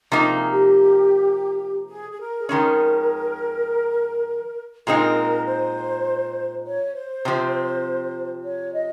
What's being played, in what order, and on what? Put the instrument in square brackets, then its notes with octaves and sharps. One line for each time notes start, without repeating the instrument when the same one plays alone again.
[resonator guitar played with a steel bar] C3 F3 A#3 D#4
[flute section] G#4
G4
G#4
G#4
A#4
G#4
[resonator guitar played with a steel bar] F2 D#3 G#3 C#4 [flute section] A#4
[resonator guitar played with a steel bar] A#2 G#3 C4 D#4 [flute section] A#4
[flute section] C5
C#5
C5
[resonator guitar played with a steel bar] C3 F3 C4
[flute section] C#5
D#5